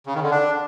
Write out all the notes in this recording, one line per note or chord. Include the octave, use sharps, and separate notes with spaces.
C#3
D#3
D3
D4